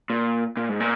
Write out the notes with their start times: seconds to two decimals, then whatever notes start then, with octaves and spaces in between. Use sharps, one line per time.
0.10 A#2
0.57 A#2
0.69 G#2
0.80 A#2